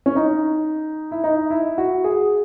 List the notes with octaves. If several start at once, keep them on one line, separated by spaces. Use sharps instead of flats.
C#4
D#4
E4
D#4
E4
F#4
G#4